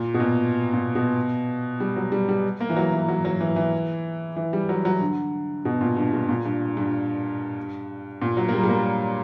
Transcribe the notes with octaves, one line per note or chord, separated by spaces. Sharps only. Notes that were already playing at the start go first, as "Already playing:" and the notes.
Already playing: A#2
B2
A#2
A#2
B2
G3
F#3
G3
G3
A#3
E3
F#3
E3
F#3
F#3
E3
E3
E3
G3
F#3
F#3
D3
B2
A#2
G2
G2
A#2
G2
G2
A#2
F#3
A#3
G3
G3
A#3